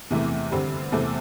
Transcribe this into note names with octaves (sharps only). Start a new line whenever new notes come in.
E2 C3 E3 A3
G2 D3 G3 C4
E2 C3 A3 C4 A4